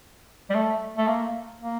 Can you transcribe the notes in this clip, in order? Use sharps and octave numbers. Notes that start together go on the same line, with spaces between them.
G3
A3
A3
A#3
A#3